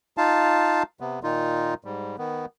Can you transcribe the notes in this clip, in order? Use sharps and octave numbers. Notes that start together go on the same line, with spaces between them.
D#4 F4 F5 A5
C3 B3
A#2 D#3 D#4 F4
G#2 G3
D#3 B3